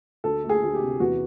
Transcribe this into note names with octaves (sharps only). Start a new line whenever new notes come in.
D2 A4
A3
G#4
D2
G4
C3
E2 F#4